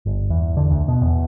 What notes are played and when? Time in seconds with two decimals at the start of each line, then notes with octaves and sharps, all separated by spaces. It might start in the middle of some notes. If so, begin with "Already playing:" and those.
0.06 G1
0.30 E2
0.57 D3
0.70 D2
0.88 B2
1.02 E2